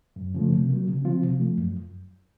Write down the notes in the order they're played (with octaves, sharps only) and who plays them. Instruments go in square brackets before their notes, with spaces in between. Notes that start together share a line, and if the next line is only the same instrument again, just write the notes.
[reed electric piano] F#2
C#3 F3 A3
C3
F#3 A#3
C#3
F3 C4 F4
C3
F3 A3
F#2